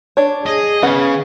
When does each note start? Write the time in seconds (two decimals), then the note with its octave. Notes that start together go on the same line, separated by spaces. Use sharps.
0.17 D4 C#5
0.46 G#4 D#5
0.83 C#3 B3 F#5